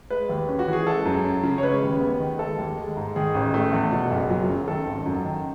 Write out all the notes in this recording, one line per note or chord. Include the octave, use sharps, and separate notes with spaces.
G#3 B4
D#2
C#4
F#4
E3 G#4
G#3 A4
F#2
C#4
C#3
C#5
G#3 B4
D#2
B3
D#3
G#3 A4
D#2
G#3
G#2
D#3 G#4
A1
A3
E2
B2
F#1
F#3
F#2
D#3 A4
G#1
F#2
D#3